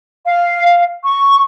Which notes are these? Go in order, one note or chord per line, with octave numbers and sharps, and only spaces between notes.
F5
C#6